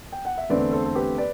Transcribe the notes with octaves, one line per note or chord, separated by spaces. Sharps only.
G5
F#5
E5
E2 D3 A3 C4 B4 D5
A4 C5
A4
G4 B4
B4 D5